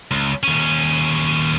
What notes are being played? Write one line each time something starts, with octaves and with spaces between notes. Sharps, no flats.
C#2
D#2 C#4